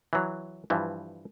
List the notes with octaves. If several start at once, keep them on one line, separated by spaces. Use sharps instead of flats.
E3 F#3
G2 E3 F3